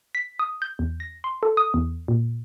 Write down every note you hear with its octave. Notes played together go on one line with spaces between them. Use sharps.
B6
D#6
G6
E2
A#6
C6
A4
D#6
E2
A#2